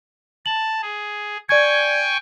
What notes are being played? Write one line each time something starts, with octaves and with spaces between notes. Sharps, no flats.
A5 F#7
G#4
D5 G5 G#5 C#6 G#6